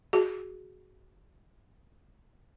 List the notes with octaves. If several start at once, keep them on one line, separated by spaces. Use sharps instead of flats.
F#4 G#4